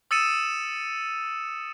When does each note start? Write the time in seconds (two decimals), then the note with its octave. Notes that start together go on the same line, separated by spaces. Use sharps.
0.11 D#6 E6 A6 C#7 D#7 E7